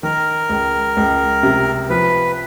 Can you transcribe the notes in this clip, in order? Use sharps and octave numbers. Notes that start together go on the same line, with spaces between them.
D#3 A#4
C#2
C#2
C3
F3 B4